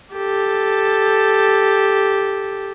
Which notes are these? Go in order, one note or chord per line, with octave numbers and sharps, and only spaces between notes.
G4 A4